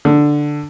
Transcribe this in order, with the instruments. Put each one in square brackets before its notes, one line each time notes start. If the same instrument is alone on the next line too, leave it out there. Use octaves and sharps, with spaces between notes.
[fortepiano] D3